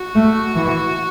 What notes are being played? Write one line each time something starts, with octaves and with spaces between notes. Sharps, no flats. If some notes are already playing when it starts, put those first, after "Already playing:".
Already playing: F#4
A3
E3